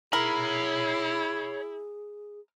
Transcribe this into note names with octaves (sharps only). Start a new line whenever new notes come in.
E4 G#4 A#4 C#5 B5